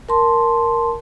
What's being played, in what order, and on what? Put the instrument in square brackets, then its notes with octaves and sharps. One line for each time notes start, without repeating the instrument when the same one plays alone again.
[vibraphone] A#4 A5 C6